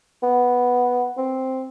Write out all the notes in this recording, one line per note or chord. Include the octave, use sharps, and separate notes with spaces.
B3
C4